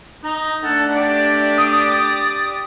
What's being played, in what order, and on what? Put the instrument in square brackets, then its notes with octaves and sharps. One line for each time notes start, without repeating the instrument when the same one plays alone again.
[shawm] D#4 [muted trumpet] A#5
[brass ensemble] A3 D4 [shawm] A4 [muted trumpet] F#5
[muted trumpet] G4 [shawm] D5
[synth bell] D#6